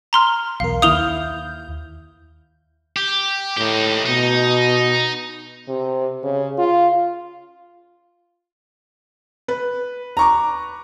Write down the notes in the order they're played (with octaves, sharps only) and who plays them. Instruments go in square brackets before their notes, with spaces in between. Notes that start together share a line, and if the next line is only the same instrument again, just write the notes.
[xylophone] A#5 C6 F6
[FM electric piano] B1 E2 A#4 [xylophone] F5
[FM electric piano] D#2 G6 [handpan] E4 F5 [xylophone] D#6 F7 G7
[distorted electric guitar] G4
[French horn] A2 [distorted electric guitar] D#4 G4
[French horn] B2 [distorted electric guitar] D#4
[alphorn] C3
C#3
F4
[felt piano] B4
[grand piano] A#5 C#6 D6